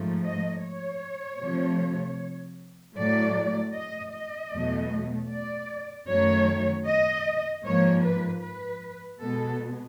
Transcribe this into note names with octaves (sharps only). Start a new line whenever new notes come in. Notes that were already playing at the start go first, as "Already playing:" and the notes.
Already playing: G#2 F3 A3
D#5
C#5
C3 F3 A3
A2 F#3 A3 D5
D#5
D#5
E2 B2 F#3 A3
D5
F#2 D#3 F#3 A3 C#5
D#5
G#2 F3 A#3 C#5
B4
B4
B2 G#3 B3 A4